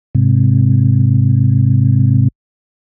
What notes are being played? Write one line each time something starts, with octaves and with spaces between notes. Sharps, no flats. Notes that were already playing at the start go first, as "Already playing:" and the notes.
G#2 C3